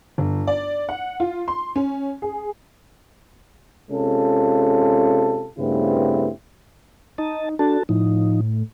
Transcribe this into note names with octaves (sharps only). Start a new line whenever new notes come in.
G1
D5
F#5
F4
C6
C#4
G#4
C3 G#3 C#4 F4 A4
G2 C#3 A3 B3 C4 E4
D#4 D#5 A5
D4 F#4 A4 A5
A2 F3 D#4